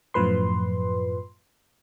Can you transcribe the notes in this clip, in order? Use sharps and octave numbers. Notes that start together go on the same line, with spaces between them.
F#2 A2 F3 B4 C6